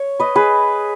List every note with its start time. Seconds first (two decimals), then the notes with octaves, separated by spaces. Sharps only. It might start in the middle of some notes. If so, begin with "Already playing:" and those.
Already playing: C#5
0.19 B4 D#5
0.36 G#4 B4